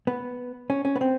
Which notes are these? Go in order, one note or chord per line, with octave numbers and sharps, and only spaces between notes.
B3
C#4
C#4
B3
C4